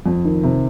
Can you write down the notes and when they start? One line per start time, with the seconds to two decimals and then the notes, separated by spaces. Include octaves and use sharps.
0.06 F2
0.25 D#3
0.43 C3